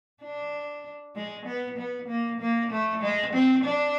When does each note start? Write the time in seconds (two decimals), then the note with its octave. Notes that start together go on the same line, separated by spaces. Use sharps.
0.23 D4
1.15 G#3
1.46 B3
1.78 B3
2.08 A#3
2.41 A#3
2.72 A3
3.02 G#3
3.33 C4
3.64 D4